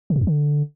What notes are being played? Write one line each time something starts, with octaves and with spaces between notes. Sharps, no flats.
C#3
A#2
E2
D3